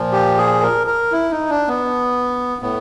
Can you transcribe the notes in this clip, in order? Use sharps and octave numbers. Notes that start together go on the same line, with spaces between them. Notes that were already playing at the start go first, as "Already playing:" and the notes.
Already playing: A#2 F3
G4
G#4
A#4
A#4
E4
D#4
D4
B3
A2 B3